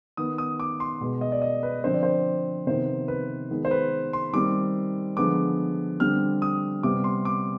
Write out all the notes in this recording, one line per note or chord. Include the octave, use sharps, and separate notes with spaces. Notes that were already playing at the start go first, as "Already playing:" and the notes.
D#3 B3 D#6
D#6
D6
C6
B2 G#3 B3
D#5
D5
D#5
B4
D3 F3 C4 C5
D5
C5
C3 D#3 B3 C5
B4
D#3 G#3 B3
C5
B4
C6
D#3 G3 C4 D6
D3 F3 G#3 B3 D6
D3 G3 C4 F6
D#6
C3 G3 B3 D6
C6
D6